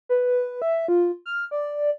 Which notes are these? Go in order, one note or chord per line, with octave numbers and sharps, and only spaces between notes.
B4
E5
F4
F6
D5